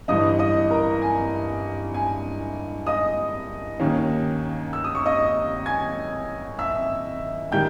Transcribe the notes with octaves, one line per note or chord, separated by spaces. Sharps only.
G1 G2 E3 D#5 D#6
D#5 D#6
A#4 A#5
G#5
G#5
D#5 D#6
D#2 D#3 A#3 C#4
E6
D#6
C#6
D#5 D#6
G#5 G#6
E5 E6
D#3 G3 G5 G6